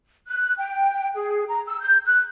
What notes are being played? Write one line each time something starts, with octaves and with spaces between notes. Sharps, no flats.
F#6
G5
G#4
A#5
E6
G6
F#6